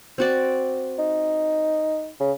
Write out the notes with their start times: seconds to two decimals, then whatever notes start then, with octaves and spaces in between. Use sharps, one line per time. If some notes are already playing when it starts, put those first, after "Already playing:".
0.18 C4 F#4 D5
0.99 D#4
2.20 C#3